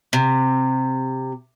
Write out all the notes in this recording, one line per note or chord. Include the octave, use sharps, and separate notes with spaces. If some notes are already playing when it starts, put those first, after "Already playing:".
C3